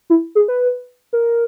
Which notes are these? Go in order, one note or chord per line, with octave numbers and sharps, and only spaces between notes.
E4
G#4
B4
A#4